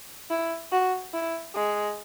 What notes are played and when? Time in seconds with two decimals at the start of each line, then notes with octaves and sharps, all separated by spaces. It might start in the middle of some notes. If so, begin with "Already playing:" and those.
0.30 E4
0.72 F#4
1.13 E4
1.55 G#3